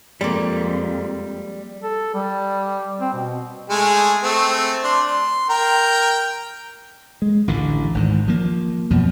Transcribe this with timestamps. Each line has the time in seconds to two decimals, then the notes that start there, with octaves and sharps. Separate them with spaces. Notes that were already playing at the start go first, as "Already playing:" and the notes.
0.21 F2 G3 G#3 A#3
1.83 A4
2.14 G3
3.00 C4
3.14 B2
3.70 G#3 A3 G#4
4.23 A3 C4
4.83 D4 C6
5.07 C6
5.50 A#4 G5 A#5
7.22 G#3
7.48 A1 D2 D3
7.95 G#1 G#2
8.28 F3 A#3
8.91 F#2 B2 F3